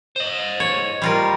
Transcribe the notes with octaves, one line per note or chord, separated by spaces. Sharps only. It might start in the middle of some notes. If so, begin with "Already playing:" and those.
C5 D#5
C#5
G3 F4 A#4